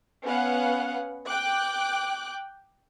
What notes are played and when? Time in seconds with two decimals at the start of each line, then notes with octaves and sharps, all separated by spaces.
0.25 B3 C#4 F5 F#5
1.28 G5 D6 F#6